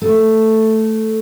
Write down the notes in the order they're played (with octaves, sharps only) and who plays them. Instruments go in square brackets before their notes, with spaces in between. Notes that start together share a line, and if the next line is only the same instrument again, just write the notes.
[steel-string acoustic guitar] A3